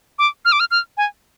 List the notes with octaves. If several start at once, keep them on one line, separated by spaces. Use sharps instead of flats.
D6
F6
D6
F6
F6
G#5